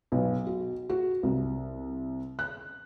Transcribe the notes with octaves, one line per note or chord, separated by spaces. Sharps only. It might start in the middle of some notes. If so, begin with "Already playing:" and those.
B1
F#4
F#4
C2
F#6